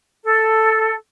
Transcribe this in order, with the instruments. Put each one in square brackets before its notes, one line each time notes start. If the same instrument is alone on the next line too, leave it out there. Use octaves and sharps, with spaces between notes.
[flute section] A4